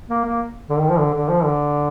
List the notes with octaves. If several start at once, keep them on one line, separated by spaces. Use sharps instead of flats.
A#3
A#3
D3
D#3
F3
D3
D3
F3
D3